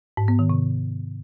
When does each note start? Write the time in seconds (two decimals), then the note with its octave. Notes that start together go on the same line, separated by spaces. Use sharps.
0.17 G#2
0.28 B3
0.39 D#3
0.50 C3